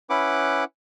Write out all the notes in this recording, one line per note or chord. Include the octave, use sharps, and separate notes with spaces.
C#4 E4 B4 F#5 D6